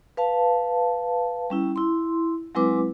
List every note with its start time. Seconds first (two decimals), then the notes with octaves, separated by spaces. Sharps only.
0.17 B4 F5 A5
1.50 G3 C#4 E4
1.76 E4 C6
2.55 F#3 G#3 C4 E4 B4 D6